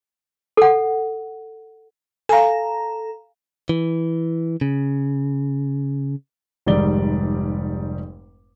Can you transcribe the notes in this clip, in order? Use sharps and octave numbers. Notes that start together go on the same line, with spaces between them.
A4 F#5
A4 F5 G#5 A#5
E3
C#3
F1 G#2 D#3 G3 D5 G7